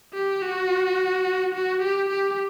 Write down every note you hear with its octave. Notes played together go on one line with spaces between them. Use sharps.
G4
F#4
F#4
G4
G4